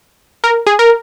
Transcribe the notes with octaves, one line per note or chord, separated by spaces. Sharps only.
A#4
G#4
A#4